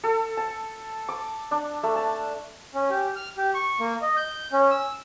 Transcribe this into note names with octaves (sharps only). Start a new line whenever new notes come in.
A4
A5
D6
D4
A3
A5
C#4
G4
F6
G4
C#6
A#3
D#5
G6
C#4
E6